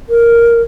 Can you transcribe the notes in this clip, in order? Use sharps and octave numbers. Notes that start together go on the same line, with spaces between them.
A#4